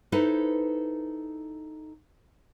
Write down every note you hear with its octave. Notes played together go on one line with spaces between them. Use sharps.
D#4 E4 A4 B4 C5